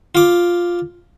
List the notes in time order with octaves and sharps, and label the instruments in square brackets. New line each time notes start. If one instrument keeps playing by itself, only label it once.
[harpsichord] F4 D6